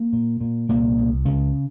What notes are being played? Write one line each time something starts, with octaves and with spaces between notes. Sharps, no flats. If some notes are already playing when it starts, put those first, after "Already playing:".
Already playing: A#3
A#2
A#2
C2 A#2 A#3
C2
C#2 C#3 C#4